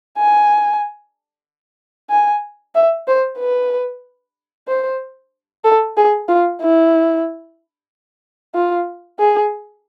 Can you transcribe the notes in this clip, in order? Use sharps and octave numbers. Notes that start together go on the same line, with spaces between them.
G#5
G#5
E5
C5
B4
C5
A4
G#4
F4
E4
F4
G#4